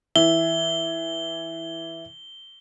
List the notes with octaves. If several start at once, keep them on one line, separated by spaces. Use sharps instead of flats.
E3 E5 G7